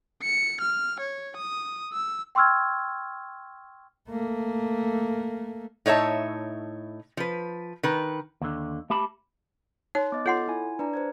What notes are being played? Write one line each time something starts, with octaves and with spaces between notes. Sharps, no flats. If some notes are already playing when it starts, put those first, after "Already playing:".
C#7
F6
C#5
D#6
E6
G5 C6 C#6 E6 F6 G#6
A3 A#3
A2 D#4 C#5 E5 A5
F3 B4
D#3 B4
D#2 D3
A3 G4 A5 B5
D#4 C#5 C6 F#6
B3 D#5 D6 A6
F4 A4 C#5 F#5 C6
E4 G#5
D4 B4 D5 A#5
B4 C5 G#6